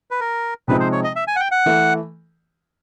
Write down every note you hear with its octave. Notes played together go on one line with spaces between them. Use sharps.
B4
A#4
C3 F3 G#3 C4 D#4 B4
C5
C#5
D#5
E5
G#5
F#5
G5
F#5
E3 A3